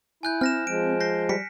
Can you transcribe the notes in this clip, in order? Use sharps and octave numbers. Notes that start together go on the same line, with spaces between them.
E4 G#5 F#6 G6
C4 F6 A#6 E7
F3 G#3 D7
G6 A#6 C7
G3 B6 C#7